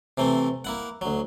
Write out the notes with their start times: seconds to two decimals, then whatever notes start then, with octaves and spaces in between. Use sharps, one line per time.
0.18 C3 E3 A3 C4
0.65 A#3 E4 F#5
1.01 D2 F#3